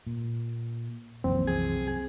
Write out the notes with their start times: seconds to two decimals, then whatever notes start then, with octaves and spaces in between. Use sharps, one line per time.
0.07 A#2
1.24 C2 F#2 E3 F3 A#3 C4
1.47 G#4